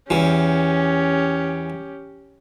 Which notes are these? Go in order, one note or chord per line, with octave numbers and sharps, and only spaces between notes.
E2 E3 C#4 G4